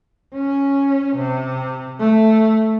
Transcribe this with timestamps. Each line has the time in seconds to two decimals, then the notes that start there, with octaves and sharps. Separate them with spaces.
0.34 C#4
1.16 C3
2.00 A3